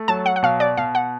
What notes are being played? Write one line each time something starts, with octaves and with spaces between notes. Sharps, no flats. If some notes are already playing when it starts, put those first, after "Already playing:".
Already playing: A3
F#3 A5
F#5
F#5
B2 F5
D5
B2 F5
F#5